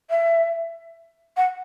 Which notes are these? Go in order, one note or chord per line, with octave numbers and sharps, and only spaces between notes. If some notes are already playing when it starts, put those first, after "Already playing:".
E5
F#5